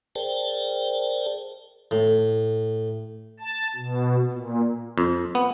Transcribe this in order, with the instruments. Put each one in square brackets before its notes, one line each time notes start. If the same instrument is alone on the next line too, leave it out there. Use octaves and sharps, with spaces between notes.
[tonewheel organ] G#4 A#4 C5 D5 G5 A5
[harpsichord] A2
[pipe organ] A5
B2
A#2
[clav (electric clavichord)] F2
B3